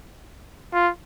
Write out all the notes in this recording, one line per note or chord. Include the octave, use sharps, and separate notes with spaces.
F4